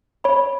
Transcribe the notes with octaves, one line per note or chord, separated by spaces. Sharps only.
C#5 B5